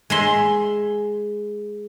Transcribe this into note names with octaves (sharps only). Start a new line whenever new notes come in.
G#3 E5 C6